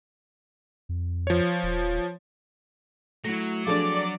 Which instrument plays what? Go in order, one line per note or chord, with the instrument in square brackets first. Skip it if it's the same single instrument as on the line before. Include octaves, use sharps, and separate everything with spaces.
[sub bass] F2
[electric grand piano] F3 C#5
[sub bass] D#1
[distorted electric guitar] F#3 [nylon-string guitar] A3 E4 [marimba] A#6
[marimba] F3 D4 [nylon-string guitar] C4 G#4 A4 [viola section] D5